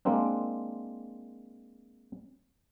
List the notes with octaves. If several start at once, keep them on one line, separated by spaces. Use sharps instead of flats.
G#3 A#3 C4 D4